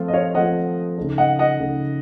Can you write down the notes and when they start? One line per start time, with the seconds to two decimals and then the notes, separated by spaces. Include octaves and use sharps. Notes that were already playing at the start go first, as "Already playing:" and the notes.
Already playing: F3 A3 C4 F4 C5
0.08 D#5
0.13 C#5 F5
0.34 F3 A3 C4 F4 C5 D#5 F#5
0.97 C#3 A3 D#4 A4
1.18 D#5 F#5
1.39 D#5 F#5
1.59 C#3 A3 D#4 A4